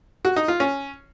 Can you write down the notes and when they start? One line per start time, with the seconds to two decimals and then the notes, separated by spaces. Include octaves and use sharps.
0.25 F#4
0.36 D#4
0.48 F4
0.60 C#4